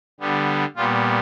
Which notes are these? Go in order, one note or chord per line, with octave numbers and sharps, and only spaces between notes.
D3 G3 B3
A#2 G3 B3 F4